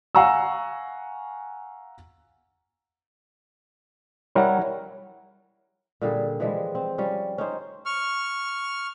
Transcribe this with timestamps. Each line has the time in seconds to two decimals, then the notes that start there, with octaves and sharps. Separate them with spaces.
0.15 F5 F#5 G#5 A#5 C#6 E6
4.35 G3 E4 A#4 C#5 F#5
6.01 A#2 D3 G3 G#4
6.40 E3 F3 G3 G#3
6.75 C4
6.98 F3 G3 C#4
7.38 C#4 D#4 C5
7.86 C#6 F6